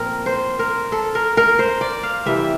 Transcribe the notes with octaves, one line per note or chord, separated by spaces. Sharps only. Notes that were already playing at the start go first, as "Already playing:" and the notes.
Already playing: A#2 F3 C4 A#4
C5
A#4
A4
A#4
A#4
C5
D5
F5
C3 E3 G3 E5